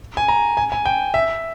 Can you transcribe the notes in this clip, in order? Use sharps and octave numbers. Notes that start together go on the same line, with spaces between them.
G#5
A#5
G#5
G#5
G5
E5